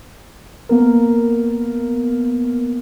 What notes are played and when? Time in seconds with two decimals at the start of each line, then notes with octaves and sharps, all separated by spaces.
0.69 A#3 B3 A#4